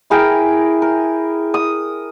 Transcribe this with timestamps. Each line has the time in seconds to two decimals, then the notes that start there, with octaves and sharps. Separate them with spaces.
0.10 E4 G#4 A#4 G5
0.82 A#4
1.54 D#6